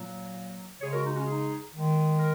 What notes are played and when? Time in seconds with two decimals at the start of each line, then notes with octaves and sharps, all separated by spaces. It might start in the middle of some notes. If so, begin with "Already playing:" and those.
Already playing: A#2 F#3 A#3
0.81 C#3 G#3 G#4 C#5
0.93 F#4 A#4
1.04 D#4
1.16 C#4 F#4
1.27 D#4 G#4
1.74 D#3 G#3
2.19 A#4